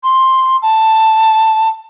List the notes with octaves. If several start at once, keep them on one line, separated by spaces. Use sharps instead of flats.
C6
A5